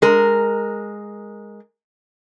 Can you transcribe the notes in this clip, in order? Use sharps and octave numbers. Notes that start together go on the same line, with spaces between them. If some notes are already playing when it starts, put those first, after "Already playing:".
G#3 A#4